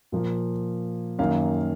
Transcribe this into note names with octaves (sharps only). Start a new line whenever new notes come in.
A#2 F3 A#3
F#2 D#3 A#3 F5